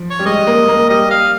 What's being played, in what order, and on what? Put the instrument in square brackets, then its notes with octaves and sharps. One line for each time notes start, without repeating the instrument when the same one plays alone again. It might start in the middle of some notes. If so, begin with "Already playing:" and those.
Already playing: [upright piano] F3
[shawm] C#5
[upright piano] G3
[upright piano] G#3 [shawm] D#5
[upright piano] A#3
A#3
[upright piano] G3 [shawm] D#5
[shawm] F5